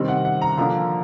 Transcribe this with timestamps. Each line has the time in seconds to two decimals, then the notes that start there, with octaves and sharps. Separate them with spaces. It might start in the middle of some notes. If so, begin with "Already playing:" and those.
Already playing: C3 D#3 G3 C4
0.08 F#5
0.25 F#5
0.42 A#5
0.57 D3 F3 A#3 D4 A#5